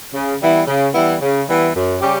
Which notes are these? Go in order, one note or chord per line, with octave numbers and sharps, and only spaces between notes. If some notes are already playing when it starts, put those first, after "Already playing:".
C#3
E3 G3 B3 E4
C#3
E3 G3 B3 E4
C#3
E3 G3 B3 E4
F#2
C#3 G3 C#4 G4